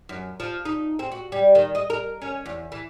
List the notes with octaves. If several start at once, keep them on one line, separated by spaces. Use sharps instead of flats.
F#2
F3
D#4
C4
F#4
G3
D#3
D#5
A#4
C#4
E2
E3